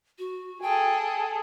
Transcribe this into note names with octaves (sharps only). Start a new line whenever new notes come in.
F#4
G#4 A4 G5